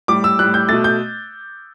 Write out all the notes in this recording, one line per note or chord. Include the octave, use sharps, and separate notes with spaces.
A2 G3 D6
E6
A2 G3 F#6
G6
B2 A3 A6
G6